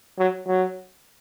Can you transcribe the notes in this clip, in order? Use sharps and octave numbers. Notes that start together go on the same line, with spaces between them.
F#3
F#3